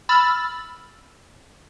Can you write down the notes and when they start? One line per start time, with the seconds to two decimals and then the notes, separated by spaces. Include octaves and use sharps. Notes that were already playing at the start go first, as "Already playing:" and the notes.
0.09 B5 E6 F6 A6